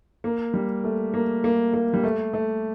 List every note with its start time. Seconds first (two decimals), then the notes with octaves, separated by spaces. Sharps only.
0.24 A#3
0.54 G3
0.84 A3
1.14 A#3
1.44 A#3
1.74 A#3
1.94 G3
2.03 A3
2.33 A3